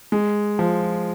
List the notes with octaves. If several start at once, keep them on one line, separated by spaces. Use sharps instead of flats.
G#3
F3